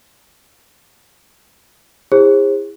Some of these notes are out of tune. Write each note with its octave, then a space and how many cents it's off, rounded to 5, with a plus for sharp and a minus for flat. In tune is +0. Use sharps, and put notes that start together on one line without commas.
E4 -10 G#4 -45 C5 +35